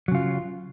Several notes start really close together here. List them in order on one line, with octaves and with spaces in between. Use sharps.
F#3 C#3 F4